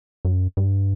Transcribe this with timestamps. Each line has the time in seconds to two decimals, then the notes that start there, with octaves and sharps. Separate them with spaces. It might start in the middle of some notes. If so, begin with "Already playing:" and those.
0.25 F#2
0.57 G2